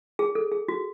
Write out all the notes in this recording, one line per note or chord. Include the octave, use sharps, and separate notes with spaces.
G#4
A4
G#4
F#4